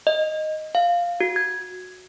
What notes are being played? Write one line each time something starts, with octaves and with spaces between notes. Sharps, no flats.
D#5
F5
F#4
G#6